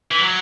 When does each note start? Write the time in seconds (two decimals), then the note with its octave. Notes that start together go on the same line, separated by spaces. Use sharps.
0.12 E3
0.21 F#3